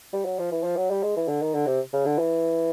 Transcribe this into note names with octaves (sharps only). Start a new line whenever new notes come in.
G3
F#3
F3
E3
F3
F#3
G3
G#3
E3
D3
D#3
D3
C3
C#3
D3
E3